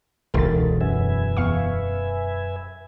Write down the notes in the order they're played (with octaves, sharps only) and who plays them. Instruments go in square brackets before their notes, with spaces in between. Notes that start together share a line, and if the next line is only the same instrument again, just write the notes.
[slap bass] E1 [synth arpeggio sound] C#2 A6 [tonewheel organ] D#4 A4 [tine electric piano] A#4
[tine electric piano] F#2 [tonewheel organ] B4 E5 G#5
[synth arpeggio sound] E2 F5 C#6